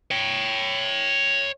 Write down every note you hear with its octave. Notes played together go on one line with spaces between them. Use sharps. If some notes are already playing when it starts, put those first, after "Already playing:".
C#5 G5